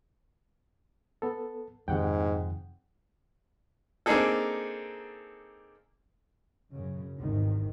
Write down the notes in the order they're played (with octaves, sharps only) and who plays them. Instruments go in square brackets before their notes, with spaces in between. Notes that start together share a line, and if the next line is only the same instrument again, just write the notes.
[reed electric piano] B3 A4
[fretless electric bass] F2 D#3 F3 [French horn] G#2 [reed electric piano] C3 F#5 G5
[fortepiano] A#3 C4 D4 D#4 G#4 A4
[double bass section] F#2 C#3
G#1 E2 G2 C3 D#3